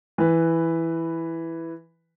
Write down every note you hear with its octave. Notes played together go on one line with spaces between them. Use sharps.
E3 B4